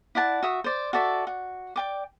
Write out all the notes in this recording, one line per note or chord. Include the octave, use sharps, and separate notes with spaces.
E4 D5 F#5 A5
F#4 E5 D#6
C5 D5
F#4 A4 D5 E5
F#4
D5 G5 D6